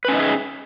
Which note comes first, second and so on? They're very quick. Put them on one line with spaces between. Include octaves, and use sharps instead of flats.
B4 C#4 D#4 E5 G#4